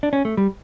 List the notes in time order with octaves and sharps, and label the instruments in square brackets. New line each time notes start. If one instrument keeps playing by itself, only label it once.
[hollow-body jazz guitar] D4
C#4
A3
G3